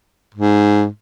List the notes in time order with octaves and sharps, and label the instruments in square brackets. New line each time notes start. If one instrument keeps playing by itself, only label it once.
[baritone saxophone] G#2